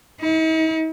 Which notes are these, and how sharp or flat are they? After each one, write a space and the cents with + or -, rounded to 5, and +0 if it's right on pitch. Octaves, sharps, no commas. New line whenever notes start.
D#4 +45